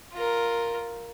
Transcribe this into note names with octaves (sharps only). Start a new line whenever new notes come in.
F4 A#4